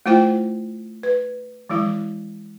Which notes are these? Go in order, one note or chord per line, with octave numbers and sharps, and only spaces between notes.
A3 E4 F4 C5 G5
B4
E3 F3 G#3 E4